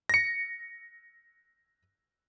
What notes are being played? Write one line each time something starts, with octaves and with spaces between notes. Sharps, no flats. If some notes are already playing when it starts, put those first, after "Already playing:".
A#6 C#7